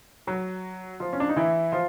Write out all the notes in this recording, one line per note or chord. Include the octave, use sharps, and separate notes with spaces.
F#3 F#4
F3 F4
C#4
D4
D#4
E3 E4
F3 F4